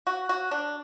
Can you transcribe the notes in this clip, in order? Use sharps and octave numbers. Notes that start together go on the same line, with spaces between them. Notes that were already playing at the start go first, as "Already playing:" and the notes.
F#4
F#4
D4